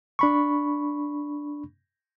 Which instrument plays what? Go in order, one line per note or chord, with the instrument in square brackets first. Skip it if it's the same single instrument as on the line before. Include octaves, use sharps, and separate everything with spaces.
[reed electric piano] D4 B5 C#6